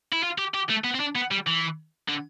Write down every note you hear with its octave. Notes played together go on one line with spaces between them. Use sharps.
E4
F4
G4
G4
A3
B3
C4
D4
B3
G3
E3
D3